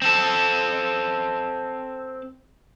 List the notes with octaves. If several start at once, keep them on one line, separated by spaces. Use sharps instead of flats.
C4 A4